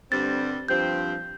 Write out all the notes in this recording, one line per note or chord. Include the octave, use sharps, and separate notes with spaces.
G2 D3 G3 C4 A6
G2 F3 C4 G4 C5 G6